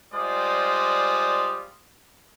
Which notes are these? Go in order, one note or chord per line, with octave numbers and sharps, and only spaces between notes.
G3 G#3 F4 C5 D5 D#6